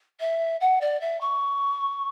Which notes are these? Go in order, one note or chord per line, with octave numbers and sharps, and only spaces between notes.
E5
F#5
D5
E5
C#6